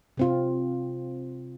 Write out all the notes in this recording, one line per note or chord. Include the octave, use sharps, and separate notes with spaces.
C3 C4 F4